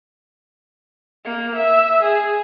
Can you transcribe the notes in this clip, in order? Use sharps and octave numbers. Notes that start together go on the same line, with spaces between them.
A#3
E5
G#4